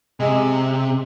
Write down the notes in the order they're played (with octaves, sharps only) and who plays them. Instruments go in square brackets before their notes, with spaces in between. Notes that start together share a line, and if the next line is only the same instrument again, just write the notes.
[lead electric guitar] C3 [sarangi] G#3